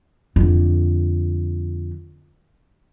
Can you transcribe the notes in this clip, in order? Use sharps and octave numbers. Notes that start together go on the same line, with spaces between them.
F2 D3